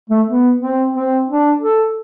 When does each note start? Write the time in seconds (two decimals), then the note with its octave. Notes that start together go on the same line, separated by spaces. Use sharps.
0.09 A3
0.27 B3
0.60 C4
0.93 C4
1.28 D4
1.61 A4